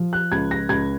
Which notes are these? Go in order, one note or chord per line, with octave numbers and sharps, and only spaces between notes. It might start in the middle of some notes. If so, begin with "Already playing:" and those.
Already playing: F3
F#6
C#2 G#6
A#6
C#2 G#6